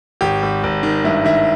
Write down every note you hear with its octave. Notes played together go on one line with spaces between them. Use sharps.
G#1 G4
G#1
G#1
D#3
G2 E4
D#3 E4